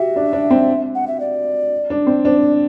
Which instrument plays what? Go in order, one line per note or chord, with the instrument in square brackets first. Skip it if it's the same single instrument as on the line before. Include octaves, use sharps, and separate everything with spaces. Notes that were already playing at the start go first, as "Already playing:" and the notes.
Already playing: [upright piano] F#4 G4 [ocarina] E5
[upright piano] D4
D4
C4
[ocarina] F#5
E5
D5
[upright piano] D4
C4
[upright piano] D4 [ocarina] C5
[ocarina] D5